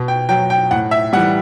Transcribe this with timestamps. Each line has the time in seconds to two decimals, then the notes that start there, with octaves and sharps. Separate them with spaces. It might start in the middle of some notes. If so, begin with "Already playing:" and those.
Already playing: B2
0.08 G5
0.29 F#3 G5
0.50 G5
0.71 A2 F#5
0.91 E5
1.13 G3 F#5
1.17 E3